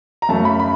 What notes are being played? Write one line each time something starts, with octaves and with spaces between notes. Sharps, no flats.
A#5
F#2 C#3 F#3 A3 A5
B5
B5